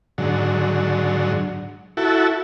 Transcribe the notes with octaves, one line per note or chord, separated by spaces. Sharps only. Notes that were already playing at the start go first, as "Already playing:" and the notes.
G#2 D3 F#3
E4 F#4 A4